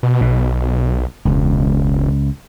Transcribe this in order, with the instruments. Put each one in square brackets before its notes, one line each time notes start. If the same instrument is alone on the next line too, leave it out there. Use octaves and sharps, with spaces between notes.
[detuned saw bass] B2
[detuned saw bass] B1 [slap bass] B2
[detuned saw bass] E1 [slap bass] C#2